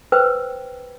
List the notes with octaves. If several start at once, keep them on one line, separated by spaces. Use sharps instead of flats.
B4 C5 G5 E6